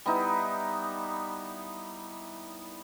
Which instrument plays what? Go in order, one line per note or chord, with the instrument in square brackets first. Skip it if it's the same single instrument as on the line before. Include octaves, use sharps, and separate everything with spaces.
[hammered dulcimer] G3 B3 D#4 E4